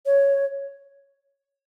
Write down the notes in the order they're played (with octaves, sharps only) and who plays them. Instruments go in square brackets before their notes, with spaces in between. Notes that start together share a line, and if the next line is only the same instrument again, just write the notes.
[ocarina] C#5